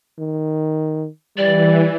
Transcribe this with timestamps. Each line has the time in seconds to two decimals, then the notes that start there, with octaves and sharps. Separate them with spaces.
0.19 D#3
1.37 E3 G3 D5